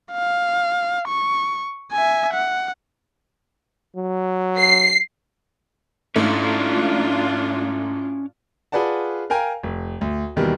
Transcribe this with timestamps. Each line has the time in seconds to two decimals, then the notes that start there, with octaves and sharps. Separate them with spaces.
0.13 F5
1.08 C#6
1.92 E5 G#5
2.34 F#5
3.96 F#3
4.59 C7
6.16 G#2 A3 C#4 D4 E4 F4
8.72 F4 G#4 B4 D5 F#5 A5
9.30 A#4 F5 G5 G#5 A#5
9.64 F1
10.01 D2
10.36 D#2 B2 D#3 E3 G3